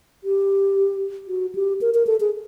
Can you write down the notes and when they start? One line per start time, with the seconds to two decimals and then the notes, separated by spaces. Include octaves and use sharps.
0.24 G4
1.28 F#4
1.55 G4
1.81 A#4
1.94 A#4
2.07 A4
2.20 G#4